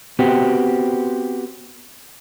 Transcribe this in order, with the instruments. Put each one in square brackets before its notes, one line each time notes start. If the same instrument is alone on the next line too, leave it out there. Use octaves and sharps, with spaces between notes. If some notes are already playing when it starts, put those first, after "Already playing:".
[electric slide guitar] B3 C4 F#4 G4